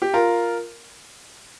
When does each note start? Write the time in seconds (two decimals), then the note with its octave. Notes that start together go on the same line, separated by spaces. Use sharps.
0.02 G4
0.14 F4 A#4